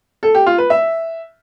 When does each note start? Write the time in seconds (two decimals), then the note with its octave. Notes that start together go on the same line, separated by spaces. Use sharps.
0.23 A4
0.35 G4
0.46 F4
0.58 B4
0.70 E5